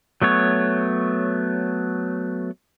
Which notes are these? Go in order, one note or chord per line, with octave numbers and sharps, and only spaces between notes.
F#3 A3 B3 C#5